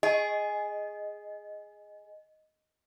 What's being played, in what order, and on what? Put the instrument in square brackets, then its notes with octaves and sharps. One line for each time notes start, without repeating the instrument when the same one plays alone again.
[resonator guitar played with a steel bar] G#4 [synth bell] D#5